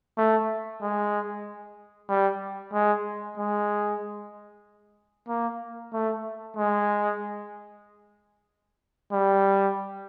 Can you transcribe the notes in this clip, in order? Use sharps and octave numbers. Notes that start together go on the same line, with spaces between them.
A3
G#3
G3
G#3
G#3
A#3
A3
G#3
G3